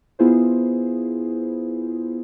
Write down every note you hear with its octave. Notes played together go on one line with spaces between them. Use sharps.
B3 E4 F4 G#4 C5